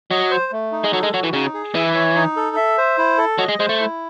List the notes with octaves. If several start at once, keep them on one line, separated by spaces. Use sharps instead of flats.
F#3 D#5
C5
A3
D#4
G#3
F#3 A4
G#3
F#3 F#4
E3
C#3 D#4
G#4
E3 E5
C#5
D#4
A4
E5
C5
E4
A4
F#3 D#5
G#3
G#3 C5
A3
E4